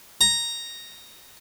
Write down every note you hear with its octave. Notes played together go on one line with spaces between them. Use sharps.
A#5